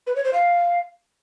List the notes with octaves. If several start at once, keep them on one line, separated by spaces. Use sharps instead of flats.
B4
C#5
C5
F5